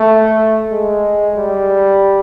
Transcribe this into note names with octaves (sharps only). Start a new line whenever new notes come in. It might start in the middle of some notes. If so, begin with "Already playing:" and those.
Already playing: A3
G#3
G3